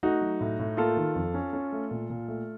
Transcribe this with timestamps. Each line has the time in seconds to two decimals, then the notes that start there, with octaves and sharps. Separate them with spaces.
0.03 A3 D#4 F#4
0.21 F#3
0.41 A2
0.59 A2
0.77 A#3 F4 A4
0.97 D#3
1.15 F2
1.34 C#4
1.53 C#4
1.72 A3
1.91 A#2
2.10 A#2
2.28 A3